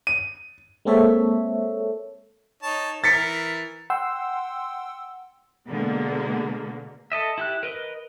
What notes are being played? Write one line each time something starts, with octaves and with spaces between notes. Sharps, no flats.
D#7
G#3 A#3 C4 A4 C#5 E5
D#4 C#5 A5
E3 A#4 A6 B6 C#7
F#5 G5 C6 E6
B2 D3 G#3 A#3
A4 D#5 E5
E4 G4 F#6
A#4 B4 D#5